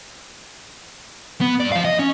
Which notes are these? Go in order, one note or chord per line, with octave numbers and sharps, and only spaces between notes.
B3
G2 D5
F3 F5
D#5
C#4